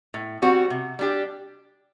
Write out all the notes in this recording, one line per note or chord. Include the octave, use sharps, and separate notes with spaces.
A2
G3 C4 F#4
C3
G3 D4 G4